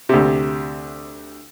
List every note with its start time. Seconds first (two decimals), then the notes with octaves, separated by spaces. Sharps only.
0.09 D2 C3